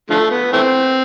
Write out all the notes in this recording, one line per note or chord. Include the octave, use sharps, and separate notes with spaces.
D3 F3 A3
B3
E3 A3 C4